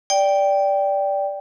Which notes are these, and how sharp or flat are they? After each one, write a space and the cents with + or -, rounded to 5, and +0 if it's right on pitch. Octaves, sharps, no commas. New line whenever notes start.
D5 -10 G5 +0